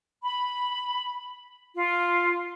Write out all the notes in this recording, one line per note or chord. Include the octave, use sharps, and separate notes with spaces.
B5
F4